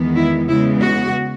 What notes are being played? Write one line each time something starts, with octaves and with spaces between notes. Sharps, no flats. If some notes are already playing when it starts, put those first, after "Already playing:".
Already playing: E2 D#3 G#3 B3
E4
C#3 G#3 B3 E4
F#4